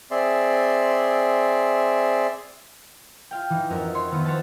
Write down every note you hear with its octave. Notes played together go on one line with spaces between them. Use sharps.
C4 G#4 D5 E5 C6
F4 F5 G5
E3 D#4
F2 C#4 F#4 A#4
C#5 C6
D#3 B3 E4 F4
C5 C#5 F#5 A5